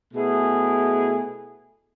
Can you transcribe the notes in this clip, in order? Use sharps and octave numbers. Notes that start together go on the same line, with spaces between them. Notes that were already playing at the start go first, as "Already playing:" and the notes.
B2 A3 E4 G#4